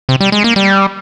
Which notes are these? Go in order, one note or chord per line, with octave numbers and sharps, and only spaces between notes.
C3
G3
G#3
A#3
G3